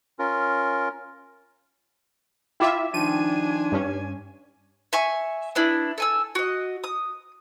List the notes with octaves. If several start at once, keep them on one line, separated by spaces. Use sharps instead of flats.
C#4 F4 A#4
E4 F4 E5 G5 D6 E7
D#3 F3 D4 G#5 D#7
G2 C#4
E5 G#5 C#6
B3 D4 E4
A4 G#5 E6
F#4 D#5
D#6